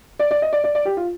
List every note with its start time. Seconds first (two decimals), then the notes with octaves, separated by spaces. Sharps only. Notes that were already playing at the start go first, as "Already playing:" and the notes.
0.19 D5
0.31 D5
0.42 D#5
0.53 D5
0.64 D5
0.75 D5
0.85 G4
0.97 F4